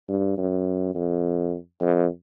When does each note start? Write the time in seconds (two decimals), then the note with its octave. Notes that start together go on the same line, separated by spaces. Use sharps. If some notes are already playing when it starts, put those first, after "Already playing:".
0.09 G2
0.38 F#2
0.95 F2
1.81 F2